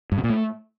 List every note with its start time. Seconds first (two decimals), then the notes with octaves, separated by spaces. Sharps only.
0.12 G2
0.18 C3
0.24 A#2
0.30 A3